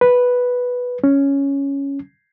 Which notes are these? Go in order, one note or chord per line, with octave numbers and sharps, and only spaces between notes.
B4
C#4